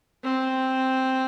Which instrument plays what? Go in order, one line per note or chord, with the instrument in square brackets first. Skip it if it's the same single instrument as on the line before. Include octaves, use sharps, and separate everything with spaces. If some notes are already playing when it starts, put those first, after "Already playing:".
[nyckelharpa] C4